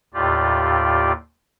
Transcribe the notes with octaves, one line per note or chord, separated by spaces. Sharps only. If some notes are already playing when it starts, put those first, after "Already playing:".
D#2 A2 F4 G4 D5